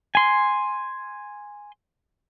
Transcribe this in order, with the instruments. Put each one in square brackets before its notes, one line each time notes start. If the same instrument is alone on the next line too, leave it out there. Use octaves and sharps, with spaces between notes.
[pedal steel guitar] G#5 C6